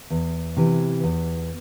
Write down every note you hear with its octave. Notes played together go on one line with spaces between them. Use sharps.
E2
C3 E3
E2